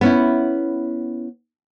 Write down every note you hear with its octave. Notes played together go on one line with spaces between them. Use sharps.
B3 C#4 E4